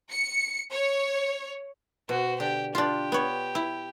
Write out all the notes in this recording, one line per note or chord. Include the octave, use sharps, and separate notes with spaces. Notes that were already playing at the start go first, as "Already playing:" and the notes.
C#7
C#5
B2 F#4 C5
D3 G4
D4 F4 G4
B3 C#5
E4